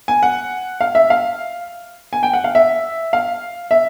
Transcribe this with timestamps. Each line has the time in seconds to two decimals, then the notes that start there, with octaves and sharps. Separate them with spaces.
0.08 G#5
0.23 F#5
0.81 F5
0.95 E5
1.10 F5
2.13 G#5
2.23 G5
2.33 F#5
2.44 F5
2.55 E5
3.13 F5
3.71 E5